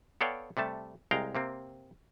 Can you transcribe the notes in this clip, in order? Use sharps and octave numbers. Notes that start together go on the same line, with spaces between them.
B3 A4 C#5 D5 F5 G5
C3 G3 A3 A5
C2 G#3 F5 G5 A#5
C3 A#3 C4